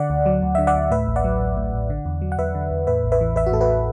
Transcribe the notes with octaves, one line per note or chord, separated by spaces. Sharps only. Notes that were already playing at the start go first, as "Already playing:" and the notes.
Already playing: D3 D5 F#5
D2
F#3
D2
D3 E5
D5 F#5
D2
A2 B4 E5
A1
D5 F#5
F#3
A1
A2
A1
D3
E2
F#3
F#5
E2 B4 E5
D3
E2
A2 B4 E5
A1
B4 E5
E3
A1 B4 E5
F#4
A2 A4
F#4 B4